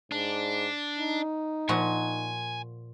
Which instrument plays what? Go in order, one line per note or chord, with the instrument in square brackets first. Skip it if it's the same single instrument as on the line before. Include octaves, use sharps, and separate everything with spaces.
[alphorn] G#2 [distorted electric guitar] D4
[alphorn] D#4
[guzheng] A#2 F3 F#4 [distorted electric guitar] G#5